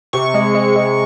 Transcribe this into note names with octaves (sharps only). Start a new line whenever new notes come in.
C3 C#6
G#3
G#3
G#3